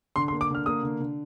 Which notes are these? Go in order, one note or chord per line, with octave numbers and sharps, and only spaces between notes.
D3 C6
C6
A#3
D6
D3 F6
A#3 D#6
D3
D3